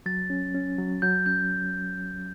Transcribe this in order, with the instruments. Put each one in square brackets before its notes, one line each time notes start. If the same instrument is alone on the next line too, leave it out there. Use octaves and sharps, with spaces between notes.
[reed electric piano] F#3 [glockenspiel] A6
[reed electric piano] C#4
C#4
F#3
[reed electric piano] F#3 [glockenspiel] G6
[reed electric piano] C#4 [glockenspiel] G6